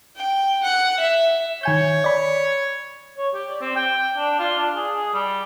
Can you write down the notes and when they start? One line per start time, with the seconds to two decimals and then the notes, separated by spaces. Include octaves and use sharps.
0.16 G5
0.63 F#5
1.00 E5
1.63 D#3 C#5 G#5 G6
2.04 D5 B5
3.18 C#5
3.34 G4
3.49 D5
3.61 C4
3.76 G5
4.17 D4
4.39 F4
4.58 D4
4.75 G#4
4.96 G#4
5.14 G3